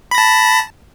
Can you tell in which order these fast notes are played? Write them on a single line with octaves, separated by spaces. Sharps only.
B5 A#6 A5